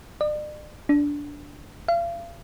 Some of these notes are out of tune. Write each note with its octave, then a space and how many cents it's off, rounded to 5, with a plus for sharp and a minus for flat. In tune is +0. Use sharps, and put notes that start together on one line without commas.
D5 +40
D4 -15
F5 -40